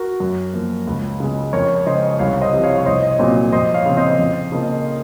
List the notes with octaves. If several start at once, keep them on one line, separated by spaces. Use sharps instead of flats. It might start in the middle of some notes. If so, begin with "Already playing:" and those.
Already playing: F#4 A#4
F#2
F3 A#3
C#2
C#3 G#3
F2 A#4 C#5
C#3 G#3 C5 D#5
C2 C#5 F5
C5 D#5
C3 F3
C#5 F5
C#5
C2 C5 D#5
D#5
C#5
A#2 F#3 C4 G#4 C5
F2 C5 D#5
C#5 F5
C#3 F3 C4
C5 D#5
F2
C#3 F3 A#3